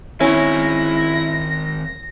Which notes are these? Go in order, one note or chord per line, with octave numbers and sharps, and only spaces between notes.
D#3 C4 C#4 E4 A#6